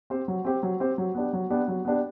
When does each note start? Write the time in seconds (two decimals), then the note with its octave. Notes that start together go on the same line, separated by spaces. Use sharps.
0.10 C4 G4 C5
0.28 F#3
0.45 C4 G4 C5
0.63 F#3
0.80 C4 G4 C5
0.98 F#3
1.15 B3 D4 G4
1.33 F#3
1.50 B3 D4 G4
1.68 F#3
1.85 B3 D4 G4